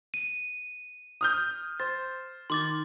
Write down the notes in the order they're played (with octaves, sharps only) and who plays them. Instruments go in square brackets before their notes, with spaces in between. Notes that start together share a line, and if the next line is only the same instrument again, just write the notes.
[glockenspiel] D#7
[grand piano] D#6 F6 G6
[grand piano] C5 [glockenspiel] A6
[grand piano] D#3 [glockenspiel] C6 D6 A6